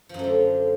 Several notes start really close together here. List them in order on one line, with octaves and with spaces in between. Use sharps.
F3 F#2 A3 D3